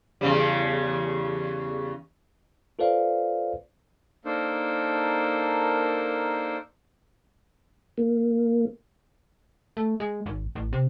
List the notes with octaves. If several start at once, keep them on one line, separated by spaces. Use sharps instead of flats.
E2 C#3 G3
F4 A4 B4 C5 D5 F5
A#3 D4 D#4 A4 A#4 C5
A#3
A3
G#3
G#1
A1
C3